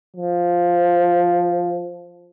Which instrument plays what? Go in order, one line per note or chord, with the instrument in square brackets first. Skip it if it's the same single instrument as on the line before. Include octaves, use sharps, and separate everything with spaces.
[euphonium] F3